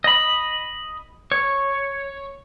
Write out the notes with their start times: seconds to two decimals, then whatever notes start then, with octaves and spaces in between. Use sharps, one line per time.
0.04 D#5 B5
1.32 C#5